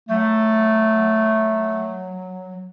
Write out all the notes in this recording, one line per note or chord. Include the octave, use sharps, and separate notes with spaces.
F#3 A3